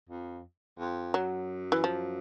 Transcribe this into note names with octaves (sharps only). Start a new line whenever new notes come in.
F2
F2
F#2 F#3
E3
F3